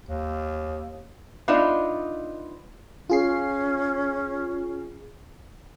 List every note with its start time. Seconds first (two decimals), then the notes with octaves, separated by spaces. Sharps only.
0.09 D#2
1.48 B3 D4 D#4 F4 D#5 E5
3.09 C#4 F4 G#4 C7